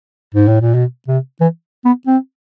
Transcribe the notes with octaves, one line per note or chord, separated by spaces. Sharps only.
G#2
A2
A#2
B2
C3
E3
B3
C4